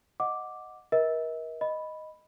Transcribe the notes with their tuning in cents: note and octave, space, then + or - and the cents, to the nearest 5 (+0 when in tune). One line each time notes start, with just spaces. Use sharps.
D#5 +0 F#5 -10 D6 +0
A#4 +35 D#5 +45
D#5 +0 B5 +0